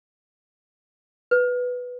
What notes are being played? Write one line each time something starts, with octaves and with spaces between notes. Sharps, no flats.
B4